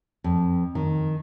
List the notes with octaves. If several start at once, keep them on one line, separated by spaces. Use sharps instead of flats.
F2
D#3